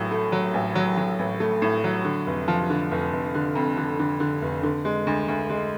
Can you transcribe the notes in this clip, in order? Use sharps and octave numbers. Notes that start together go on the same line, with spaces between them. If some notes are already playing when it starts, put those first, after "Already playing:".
Already playing: A1 A2 F#3
A3
F#3
A1
F#3
F#3
A1
A3
A2
F#3
D3
F1
F3
D3
F1
F1
D3
F2
D3
D3
D3
F1
D3
G#3
D2
D2
G#3